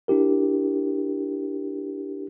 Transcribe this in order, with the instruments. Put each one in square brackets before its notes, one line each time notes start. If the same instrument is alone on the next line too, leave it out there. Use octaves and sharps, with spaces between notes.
[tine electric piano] D4 E4 G4 A#4